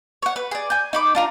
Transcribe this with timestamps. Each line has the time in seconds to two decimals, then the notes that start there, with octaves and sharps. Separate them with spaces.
0.22 C#5 F#5
0.36 B4
0.51 G#4 D5
0.70 G#5 G6
0.93 D#4 B5 D6
1.15 D4 F4 A#5